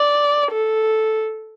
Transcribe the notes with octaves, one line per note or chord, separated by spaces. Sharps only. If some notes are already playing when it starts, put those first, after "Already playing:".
Already playing: D5
A4